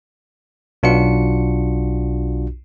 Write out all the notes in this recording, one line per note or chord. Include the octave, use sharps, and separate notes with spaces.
B1 D4 F4 F#4 C#7